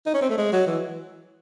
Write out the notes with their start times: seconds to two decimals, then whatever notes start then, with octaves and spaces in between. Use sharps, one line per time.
0.06 D#4
0.14 C#4
0.21 C4
0.30 A3
0.38 G#3
0.53 F#3
0.67 E3